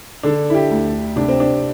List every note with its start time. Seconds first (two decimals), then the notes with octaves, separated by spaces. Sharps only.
0.23 D3 D4
0.50 E4
0.55 G4
0.70 D2
1.16 C3 D4
1.28 C4
1.40 D4